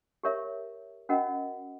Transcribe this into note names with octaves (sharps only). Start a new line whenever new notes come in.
G4 A#4 C#5 E5
C#4 F#4 A#4 D#5 F#5